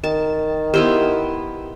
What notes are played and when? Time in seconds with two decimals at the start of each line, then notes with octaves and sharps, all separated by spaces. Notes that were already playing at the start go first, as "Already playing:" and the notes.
0.04 D#3 A5
0.74 B3 E4 G4 C5